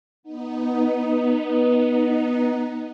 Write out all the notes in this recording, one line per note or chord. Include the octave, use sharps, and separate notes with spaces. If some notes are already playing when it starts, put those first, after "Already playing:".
B3 D#4